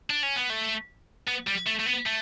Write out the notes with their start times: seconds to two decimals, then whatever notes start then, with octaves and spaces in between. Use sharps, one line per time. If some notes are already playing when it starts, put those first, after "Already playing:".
0.10 D4
0.23 C#4
0.36 B3
0.50 A3
1.28 B3
1.47 G3
1.67 A3
1.80 A3
1.86 B3
2.06 A3